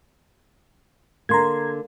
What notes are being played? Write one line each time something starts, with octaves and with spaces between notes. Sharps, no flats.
D3 A#3 A#5 C6 G#6